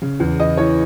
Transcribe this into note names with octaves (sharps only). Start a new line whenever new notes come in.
C#3
E2
E2 D#5
E3 C#5